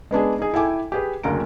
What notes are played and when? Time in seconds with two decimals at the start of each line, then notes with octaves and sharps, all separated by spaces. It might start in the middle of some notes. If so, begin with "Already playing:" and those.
0.11 G#3 B3 D4 G#4
0.39 D#4 G#4
0.53 E4 A4 G5 G#5 D6
0.92 G4 G#4 B4
1.23 F#1 D2 A#4 A#5 D7